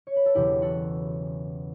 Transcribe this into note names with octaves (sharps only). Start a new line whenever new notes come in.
C#5
B4
A4
E1 E2 C#3 F#3 E4 G4
F#4 A4